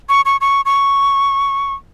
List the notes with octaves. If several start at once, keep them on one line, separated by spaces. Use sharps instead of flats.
C#6
C#6
C#6
C#6